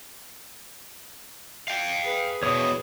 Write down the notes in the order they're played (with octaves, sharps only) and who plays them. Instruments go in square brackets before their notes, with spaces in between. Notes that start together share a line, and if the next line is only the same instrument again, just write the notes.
[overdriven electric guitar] F5 G5
[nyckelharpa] G#4 B4
[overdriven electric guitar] E2 B2 [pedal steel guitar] C#5 D#6